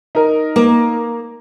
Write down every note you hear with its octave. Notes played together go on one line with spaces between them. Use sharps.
D#4 A#4
A#3